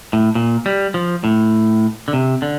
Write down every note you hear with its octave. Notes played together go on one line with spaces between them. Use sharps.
A2
A#2
G3
F3
A2
D3
C3
D3